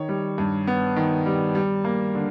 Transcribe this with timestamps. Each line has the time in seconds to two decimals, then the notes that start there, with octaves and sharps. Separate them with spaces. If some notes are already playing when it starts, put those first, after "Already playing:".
Already playing: D#3 C#5
0.09 G3
0.38 G2
0.67 B3
0.96 D#3
1.26 G3
1.55 G3
1.84 A#3
2.15 D3